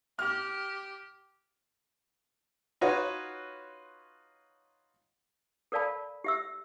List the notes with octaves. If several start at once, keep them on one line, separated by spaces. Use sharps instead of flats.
G4 F6
D#4 F4 F#4 B4 C#5
A4 A#4 D5 F5 A5 B5
G4 E5 E6